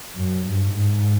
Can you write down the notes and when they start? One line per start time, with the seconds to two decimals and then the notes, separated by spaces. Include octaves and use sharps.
0.16 F#2
0.45 G2
0.75 G#2